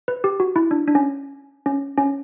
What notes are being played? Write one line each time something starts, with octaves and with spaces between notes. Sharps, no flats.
B4
G4
F#4
E4
D4
D4
C#4
C#4
C#4